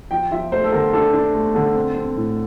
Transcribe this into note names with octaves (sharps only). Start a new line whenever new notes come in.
F3 G5
F3 E5
A3 C5
A4
D3 A#4
D4 A4
D4
A3
D3
C4
C4
A2